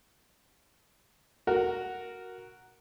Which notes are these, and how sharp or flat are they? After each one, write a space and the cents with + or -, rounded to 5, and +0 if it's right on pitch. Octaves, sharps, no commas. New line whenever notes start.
F#4 +0 A#4 +0